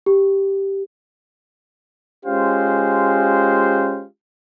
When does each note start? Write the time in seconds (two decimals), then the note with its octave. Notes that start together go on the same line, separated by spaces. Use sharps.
0.06 G4
2.26 G#3 C#4 F4 G4 C5 F5